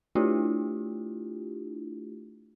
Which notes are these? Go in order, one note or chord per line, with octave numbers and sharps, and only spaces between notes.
A3 D4 E4 F4 G4